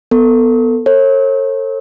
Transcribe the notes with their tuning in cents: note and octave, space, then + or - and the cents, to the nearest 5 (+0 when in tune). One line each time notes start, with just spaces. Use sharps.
B3 +0 A4 +25
A4 +40 C#5 -40